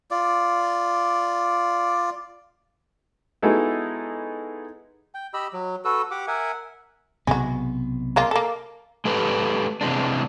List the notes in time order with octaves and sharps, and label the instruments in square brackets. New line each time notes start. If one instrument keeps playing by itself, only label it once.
[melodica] F4 D5
[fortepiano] G#3 B3 D#4 E4 F#4 A4
[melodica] G5
G4 D#5 B5 E6
F#3
F#4 A4 B4 E6
G4 F#5 D6
A#4 E5 F#5 G#5
[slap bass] B1 C3 B3 [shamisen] G#3 F#4
[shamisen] G#3 A#3 F4
A#3 A4
[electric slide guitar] G#3 G4 A4 B4
C3 E3 G#3 D4